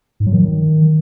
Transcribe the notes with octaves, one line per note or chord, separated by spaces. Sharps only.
G#2
F#3
D#3